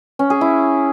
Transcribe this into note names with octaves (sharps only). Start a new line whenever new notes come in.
C#4
G#4
E4